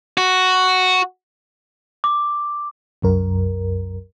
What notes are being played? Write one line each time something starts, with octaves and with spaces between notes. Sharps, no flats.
F#4
D6
C2 F#2 A#4